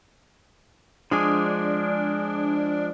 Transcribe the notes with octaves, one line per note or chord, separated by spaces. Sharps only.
F3 G#3 D4 G#4